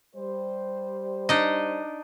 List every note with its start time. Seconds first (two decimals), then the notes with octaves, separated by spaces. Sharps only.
0.15 G3 C5
1.29 D4 D#4 D#5